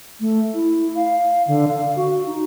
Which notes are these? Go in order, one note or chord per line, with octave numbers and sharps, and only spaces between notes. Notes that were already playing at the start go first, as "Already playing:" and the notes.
A3
E4
F5
D3
F5
F#4
D#4